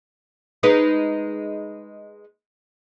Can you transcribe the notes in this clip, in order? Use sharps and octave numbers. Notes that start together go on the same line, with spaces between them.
G#3 D#4 B4